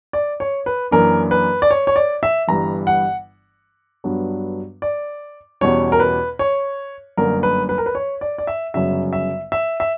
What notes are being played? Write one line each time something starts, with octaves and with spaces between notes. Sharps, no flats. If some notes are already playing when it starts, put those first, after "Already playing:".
D5
C#5
B4
F#2 E3 A#3 D4 A#4
B4
D5
C#5
C#5
D5
E5
G1 G2 E3 G3 A#5
F#5
G2 F#3 B3 D4
D5
E2 B2 G3 C#4 C#5
A#4
B4
C#5
G1 F#2 D3 A#3 A#4
B4
B4
A#4
B4
C#5
D5
D5
E5
G1 F#2 C#3 F#3 E5
E5
E5
E5